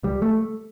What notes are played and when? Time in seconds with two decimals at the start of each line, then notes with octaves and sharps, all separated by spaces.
0.03 C#2 G3
0.22 A3